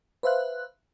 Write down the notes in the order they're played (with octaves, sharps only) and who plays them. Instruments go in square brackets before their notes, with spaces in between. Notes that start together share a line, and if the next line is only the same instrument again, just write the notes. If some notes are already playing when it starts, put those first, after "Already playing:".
[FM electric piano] B4 C5 E5 F5 F#6